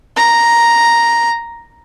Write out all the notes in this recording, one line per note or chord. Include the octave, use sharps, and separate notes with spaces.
A#5